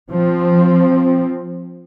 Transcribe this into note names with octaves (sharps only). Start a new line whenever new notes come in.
F3 C4